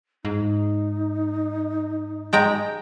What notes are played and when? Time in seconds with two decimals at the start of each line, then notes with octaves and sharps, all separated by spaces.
0.25 G#2 D#4
2.33 G#3 G5 A#5